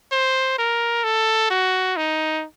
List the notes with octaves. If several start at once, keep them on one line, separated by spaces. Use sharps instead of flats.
C5
A#4
A4
F#4
D#4